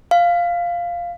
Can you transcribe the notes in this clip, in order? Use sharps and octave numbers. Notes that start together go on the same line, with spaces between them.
F5